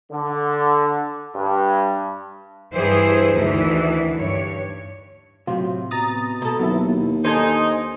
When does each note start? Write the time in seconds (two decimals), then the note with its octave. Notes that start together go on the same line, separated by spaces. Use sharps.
0.12 D3
1.34 G2
2.74 G2 E3 G#4 C5
3.34 D2 D#3 E3
4.16 G2 C#5
5.47 A2 C3 F#3 F4
5.91 B2 A#5 D#6 A6
6.42 B2 A4
6.59 D#2 F#3 B3 E4
7.25 D#3 D4 D#4 A4 C5 G#5